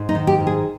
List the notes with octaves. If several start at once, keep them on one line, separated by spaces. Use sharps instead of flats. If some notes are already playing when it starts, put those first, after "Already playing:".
Already playing: G#2
D#4
D#3
G4
G#2
G#4